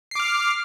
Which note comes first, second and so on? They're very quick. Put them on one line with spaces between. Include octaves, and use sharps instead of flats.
C7 D6 F6